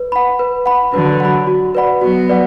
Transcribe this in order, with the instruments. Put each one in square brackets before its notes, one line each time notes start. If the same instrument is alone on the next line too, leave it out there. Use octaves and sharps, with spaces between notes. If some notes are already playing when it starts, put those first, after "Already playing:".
Already playing: [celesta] B4
F#5 B5
B4
F#5 B5
[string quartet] D3 F#3 [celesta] B4
[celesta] F#5 B5
F#4
B4 D5 F#5 B5
[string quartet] F#3 B3 [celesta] F#4
[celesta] B4 D5 F#5